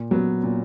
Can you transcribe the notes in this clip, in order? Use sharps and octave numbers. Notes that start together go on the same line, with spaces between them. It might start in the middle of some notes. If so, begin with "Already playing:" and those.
Already playing: A#2
F#3 B3
A#2